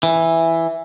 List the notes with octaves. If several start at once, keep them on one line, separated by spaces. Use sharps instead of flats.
E3